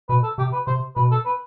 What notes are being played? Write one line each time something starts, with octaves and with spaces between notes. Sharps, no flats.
B2 B4
A4
C3 G4
B4
C3 C5
B2 B4
A4
B4